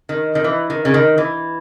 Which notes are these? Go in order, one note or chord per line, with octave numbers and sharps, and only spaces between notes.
D#3
D#3
E3
D#3
C#3
D#3
E3